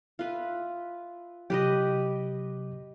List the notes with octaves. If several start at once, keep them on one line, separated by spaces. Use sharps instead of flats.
F4 B4 E5
C3 F#3 G4 B4 D#5